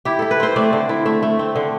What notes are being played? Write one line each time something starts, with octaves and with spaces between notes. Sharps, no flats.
E4 G4
E4 A4
B4
C4 C5
A3 D5
D3
E4
A3 E5
A3
C4
D3